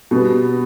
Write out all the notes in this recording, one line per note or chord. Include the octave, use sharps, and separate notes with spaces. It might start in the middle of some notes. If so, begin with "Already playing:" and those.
B2 G3 B3